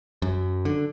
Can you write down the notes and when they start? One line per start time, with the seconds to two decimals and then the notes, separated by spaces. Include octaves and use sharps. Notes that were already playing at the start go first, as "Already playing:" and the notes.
0.22 F#2
0.65 D3